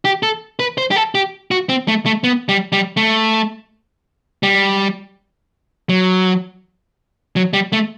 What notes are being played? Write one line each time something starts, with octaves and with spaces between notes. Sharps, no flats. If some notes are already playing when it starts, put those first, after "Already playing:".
G4
A4
B4
C5
G4
A4
G4
F#4
C4
A3
A3
B3
G3
G3
A3
G3
F#3
F#3
G3
A3